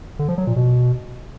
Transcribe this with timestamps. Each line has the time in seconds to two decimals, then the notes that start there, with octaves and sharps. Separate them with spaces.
0.19 D3
0.28 F3
0.38 F#3
0.47 A#2
0.56 B2